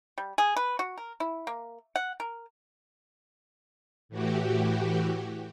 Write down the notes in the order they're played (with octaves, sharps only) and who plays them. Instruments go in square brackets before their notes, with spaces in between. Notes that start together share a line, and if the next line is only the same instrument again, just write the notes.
[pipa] G3
G#4
B4
F#4
A#4
E4
A#3
F#5
A#4
[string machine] A2 E3 F#4 G4